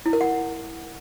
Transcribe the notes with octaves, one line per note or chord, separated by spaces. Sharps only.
E4
A#4
F#5